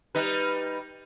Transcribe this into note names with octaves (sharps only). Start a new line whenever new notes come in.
G3 D#4 B4